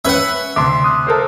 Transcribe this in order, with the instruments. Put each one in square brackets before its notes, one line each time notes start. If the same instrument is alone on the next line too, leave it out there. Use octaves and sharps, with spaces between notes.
[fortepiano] C#4 B4 [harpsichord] E5 F#5
[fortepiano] D2 [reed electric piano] C3 C6 D6
[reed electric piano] D#6 F#6
[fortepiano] A4 A#4 C5